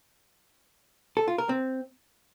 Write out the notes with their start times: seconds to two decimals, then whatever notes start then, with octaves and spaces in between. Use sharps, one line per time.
1.17 A4
1.28 F4
1.38 A#4
1.49 C4